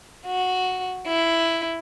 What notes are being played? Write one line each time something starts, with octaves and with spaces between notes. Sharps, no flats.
F#4
E4